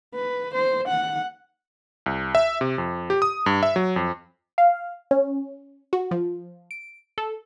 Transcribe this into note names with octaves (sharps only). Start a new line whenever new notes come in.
B4
C5
F#5
C2
E5
C3
F2
G4
D#6
G2
E5
F#3
F2
F5
C#4
F#4
F3
D7
A4